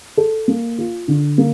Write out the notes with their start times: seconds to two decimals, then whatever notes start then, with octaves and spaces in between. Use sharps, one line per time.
0.17 A4
0.48 A#3
0.78 F4
1.08 D3
1.38 A#3